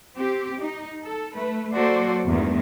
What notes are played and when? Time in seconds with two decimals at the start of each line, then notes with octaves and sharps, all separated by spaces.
0.17 C4 G4
0.61 D#4
1.04 A4
1.35 A3 B4
1.74 F#3 A#3 F#4 A4 C5 D5
2.26 E2 G2 D#3 G#3 A3